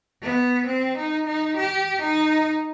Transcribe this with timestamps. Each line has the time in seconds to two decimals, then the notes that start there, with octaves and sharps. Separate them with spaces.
0.23 B3
0.67 C4
0.97 D#4
1.27 D#4
1.56 G4
2.01 D#4